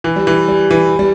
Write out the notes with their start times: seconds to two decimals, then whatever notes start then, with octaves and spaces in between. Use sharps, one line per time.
0.04 E3
0.16 G3
0.27 E3
0.48 G3
0.71 E3
0.99 G3